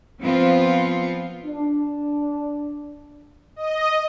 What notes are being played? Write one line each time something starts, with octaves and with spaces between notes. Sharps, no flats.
F3 B3 C4 F4
D4
D#5